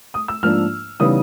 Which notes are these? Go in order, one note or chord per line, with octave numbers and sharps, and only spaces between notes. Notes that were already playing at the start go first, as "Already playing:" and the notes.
D#6
E6
G#2 F3 A#3 D4 F6
C#3 E3 G3 B3 D#4 D#6